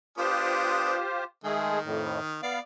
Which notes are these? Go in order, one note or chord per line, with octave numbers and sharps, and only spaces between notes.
B3 D4 F4 G4 C5 D#6
D#3 G#3 A3 G#4
F2 A2
B3 D5 F5